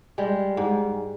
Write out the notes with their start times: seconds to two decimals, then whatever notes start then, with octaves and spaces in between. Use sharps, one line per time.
0.18 G3 G#3
0.57 G#2